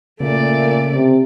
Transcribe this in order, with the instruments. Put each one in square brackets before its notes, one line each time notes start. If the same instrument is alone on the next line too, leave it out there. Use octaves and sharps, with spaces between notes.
[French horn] A#2 [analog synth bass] C#3 [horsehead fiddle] A3 D5
[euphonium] C3